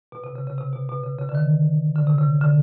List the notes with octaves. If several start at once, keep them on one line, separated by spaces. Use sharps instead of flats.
B2
C3
C#3
C#3
C3
B2
B2
C#3
C#3
D3
D#3
D3
C3
C#3
D3